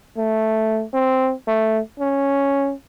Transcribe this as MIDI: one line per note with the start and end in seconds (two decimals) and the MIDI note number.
0.17 0.84 57
0.94 1.33 60
1.47 1.80 57
1.99 2.73 61